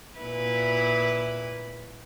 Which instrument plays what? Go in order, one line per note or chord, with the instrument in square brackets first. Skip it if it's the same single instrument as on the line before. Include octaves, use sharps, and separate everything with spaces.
[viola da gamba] A#2 E4 B4